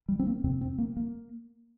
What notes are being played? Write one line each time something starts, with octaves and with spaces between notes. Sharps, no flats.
G3
C4
A#3
F2 C3 C4
C4
A#3
A#3